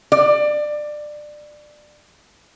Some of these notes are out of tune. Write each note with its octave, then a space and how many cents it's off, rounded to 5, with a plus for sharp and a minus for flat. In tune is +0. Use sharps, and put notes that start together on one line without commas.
D5 +20